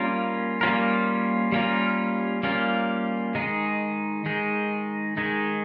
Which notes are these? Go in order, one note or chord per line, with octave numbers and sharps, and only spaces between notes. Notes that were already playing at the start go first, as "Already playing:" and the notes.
Already playing: G3 A#3 C#4 F4 A#4
G3 A#3 C#4 F4 A#4
G3 A#3 C#4 F4 A#4
G3 A#3 C#4 F4 A#4
D#3 G#3 D#4 G#4
D#3 G#3 D#4 G#4
D#3 G#3 D#4 G#4